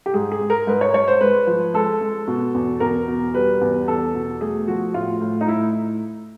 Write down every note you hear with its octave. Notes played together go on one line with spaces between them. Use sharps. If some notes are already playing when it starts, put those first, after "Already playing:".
G4
G#2 G#4
G#4
G#3
A#4
G#2 B4
C#5
G#2 C#5
C5
G#3 B4
F3
G#3 A4
G#3
B2
E2
E2 A#4
B2
G3 B4
E2
E2 A4
B2
A3 G#4
F3 F#4
A2 F4
A2
D#4
A2 E4